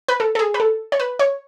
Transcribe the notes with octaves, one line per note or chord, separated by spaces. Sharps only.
B4
A4
A4
G#4
B4
A4
C#5
B4
C#5